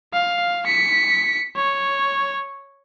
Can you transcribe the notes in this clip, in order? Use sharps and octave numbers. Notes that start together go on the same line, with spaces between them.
F5
B6 C#7
C#5